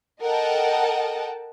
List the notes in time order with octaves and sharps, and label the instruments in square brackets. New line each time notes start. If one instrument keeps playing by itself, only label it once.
[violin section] A4 A#4 D#5 F#5 G5 A5